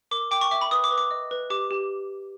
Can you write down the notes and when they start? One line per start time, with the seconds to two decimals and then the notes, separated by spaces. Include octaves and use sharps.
0.11 A#4 D6
0.31 G5 D6
0.41 C#6
0.51 E5 D6
0.61 B5
0.71 B4 D#6
0.84 D6
0.91 B4
0.98 D6
1.11 D#5
1.31 B4
1.50 G4 D6
1.71 G4